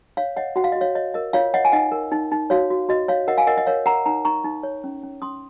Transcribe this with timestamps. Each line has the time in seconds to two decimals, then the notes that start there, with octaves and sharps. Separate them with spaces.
0.17 C#5 F5
0.36 C#5 D#5 F#5
0.56 F#4 F#5
0.64 F5
0.72 D#5
0.76 F#4
0.81 C#5 F5
0.95 C#5 D#5
1.14 A#4 D#5
1.33 F4 C#5 F5
1.54 C#5 D#5 F#5
1.65 G#5
1.72 D#4 D#5 F#5
1.92 A#4
2.12 D#4
2.31 D#4
2.50 F#4 C#5 F5
2.70 F#4
2.89 F#4 D#5
3.08 C#5 F5
3.28 A#4 D#5 F#5
3.38 F5 G#5
3.47 A#4 D#5 F#5
3.57 D#5 F#5
3.66 A#4 C#5 F5
3.86 A#4 F#5 A#5
4.05 D#4 F#5 A#5
4.25 D#4 A#5 C#6
4.44 D#4
4.63 C#5
4.84 C#4
5.03 C#4
5.22 C#4 C6 D#6